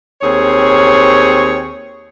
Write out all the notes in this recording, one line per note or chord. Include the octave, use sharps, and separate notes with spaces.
D#2 C4 G#4 C#5